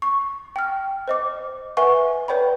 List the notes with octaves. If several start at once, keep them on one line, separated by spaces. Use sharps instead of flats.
C#6
G5 F6
C5 D#5 D6
B4 E5 F#5 G#5 C#6
B4 C#5 D5 G5 B5